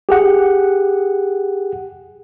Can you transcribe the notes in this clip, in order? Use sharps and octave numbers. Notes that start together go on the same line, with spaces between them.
G4 G#4 F#5